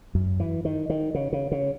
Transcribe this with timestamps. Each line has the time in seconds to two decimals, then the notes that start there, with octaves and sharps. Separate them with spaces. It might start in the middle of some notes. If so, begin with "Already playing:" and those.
0.15 F#2
0.40 E3
0.65 D#3
0.90 D#3
1.15 C#3
1.33 C#3
1.52 C#3